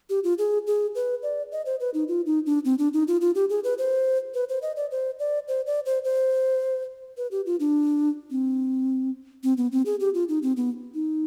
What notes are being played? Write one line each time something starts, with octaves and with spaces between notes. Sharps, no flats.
G4
F4
G#4
G#4
B4
D5
D#5
C5
B4
D#4
F4
D#4
D4
C4
D4
D#4
F4
F4
G4
G#4
B4
C5
B4
C5
D#5
D5
C5
D5
C5
D5
C5
C5
B4
G4
F4
D4
C4
C4
B3
C4
G#4
G4
F4
D#4
C4
B3
D#4